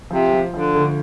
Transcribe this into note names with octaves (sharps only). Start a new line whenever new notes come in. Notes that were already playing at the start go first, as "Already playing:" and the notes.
C3 F3
F3
D3 F3
D2